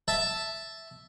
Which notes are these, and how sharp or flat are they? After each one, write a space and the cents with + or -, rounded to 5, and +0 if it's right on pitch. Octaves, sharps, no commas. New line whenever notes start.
E5 +0 A5 +0